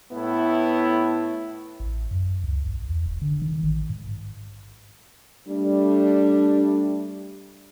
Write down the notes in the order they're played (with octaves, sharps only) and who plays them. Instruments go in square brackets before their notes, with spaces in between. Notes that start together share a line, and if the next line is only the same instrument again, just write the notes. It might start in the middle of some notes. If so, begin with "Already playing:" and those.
[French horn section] A2 B3 E4
[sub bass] A1
F#2
C#2
A#1
E2
E1
D3
D#3
A1
G#2
[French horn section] G3 A3 D4